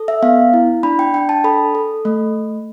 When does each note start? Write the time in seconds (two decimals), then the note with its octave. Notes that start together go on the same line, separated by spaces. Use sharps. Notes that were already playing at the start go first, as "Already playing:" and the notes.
Already playing: A4
0.08 E5
0.22 B3 F5
0.53 E4
0.83 D4 B5
0.99 G5
1.14 D4 G5
1.29 A5
1.44 A4 B5
1.75 A4
2.05 A3